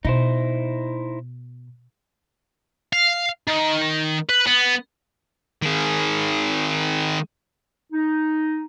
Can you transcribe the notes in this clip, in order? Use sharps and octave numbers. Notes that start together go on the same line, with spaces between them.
B2 D#4 E4 C5
F5
D#3
B4
B3
D#3 G#4
D#4